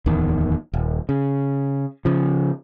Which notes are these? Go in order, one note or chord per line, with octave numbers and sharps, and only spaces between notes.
D1 E2 D#3
D#1
C#3
C#3 F3